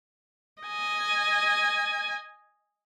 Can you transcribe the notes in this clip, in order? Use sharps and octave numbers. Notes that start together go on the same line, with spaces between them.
D#5 G#5